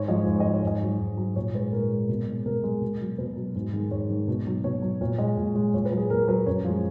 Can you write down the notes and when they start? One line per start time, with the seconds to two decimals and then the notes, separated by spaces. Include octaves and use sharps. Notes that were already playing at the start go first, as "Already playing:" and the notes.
Already playing: G#2 C#5
0.08 F3 G#3 D#5
0.27 G#2
0.40 D#5
0.45 F3 G#3
0.53 C#5
0.63 G#2 D#5
0.81 F#3
1.00 G#2
1.17 F#3
1.36 A#2 C#5
1.54 G#3 B4
1.73 A#2 A#4
1.90 G#3
2.09 B2
2.27 G#3
2.46 B2 A#4
2.64 G#3
2.81 B2
3.00 F#3
3.18 B2 B4
3.36 F#3
3.55 G#2
3.73 D#3 G#3
3.91 G#2 C#5
4.10 D#3 G#3
4.28 B2
4.47 F#3
4.64 B2 C#5
4.82 F#3
5.01 A#2 C#5
5.18 G#3 D#5
5.37 A#2
5.56 G#3
5.74 A#2 C#5
5.85 B4
5.92 F#3
5.97 G#4
6.10 A#2 A#4
6.28 F#3 B4
6.46 F#2 C#5
6.64 F3 G#3